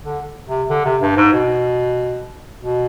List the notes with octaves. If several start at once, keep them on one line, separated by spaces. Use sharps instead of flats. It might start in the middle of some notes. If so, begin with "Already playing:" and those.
D3
C3
D3
C3
G2
G#2
B2
B2